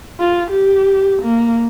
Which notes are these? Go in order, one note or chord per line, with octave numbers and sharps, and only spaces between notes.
F4
G4
A#3